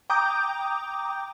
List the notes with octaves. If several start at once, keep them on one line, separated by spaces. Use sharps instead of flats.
G5 A#5 D6 D#6 G6